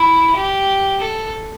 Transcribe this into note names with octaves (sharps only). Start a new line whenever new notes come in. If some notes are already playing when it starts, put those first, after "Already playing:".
Already playing: E4
G4
A4